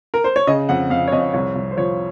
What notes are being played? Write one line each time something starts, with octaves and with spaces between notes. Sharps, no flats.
A#4
C5
C#5
C#3 D#5
F2 F#5
F2 F5
C#5
F2 D#5
D#5
C2 C#5
C2
C5
F3 C#5